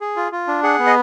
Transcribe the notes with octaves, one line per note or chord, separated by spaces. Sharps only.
G#4
F4
F4
D4
G#4 F#5
B3
D#5